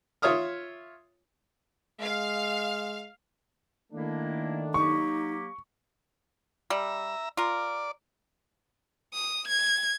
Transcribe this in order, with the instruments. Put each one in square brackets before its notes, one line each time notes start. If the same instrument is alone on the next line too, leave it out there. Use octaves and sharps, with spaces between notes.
[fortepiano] F4 C#5 E5 D#6 F6
[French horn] G#3 [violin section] F5
[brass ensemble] D#3 A3 D4 [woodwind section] A#3 E4
[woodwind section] F#3 A#3 G4 [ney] D#4 [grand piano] C#6
[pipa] G3 [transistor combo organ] E5 A#5
[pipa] F4 A#4 [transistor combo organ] D5
[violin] D#6
G#6